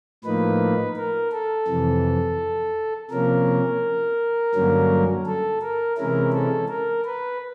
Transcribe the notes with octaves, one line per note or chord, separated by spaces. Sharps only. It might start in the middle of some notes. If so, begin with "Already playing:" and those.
A2 F3 A#3 D#4 B4
A#4
A4
F2 C3 E3
C3 F3 A#3 C#4 A#4
G2 D3 F#3 A#3 C#4
A4
A#4
C3 E3 G#3 C#4 E4 A#4
A4
A#4
B4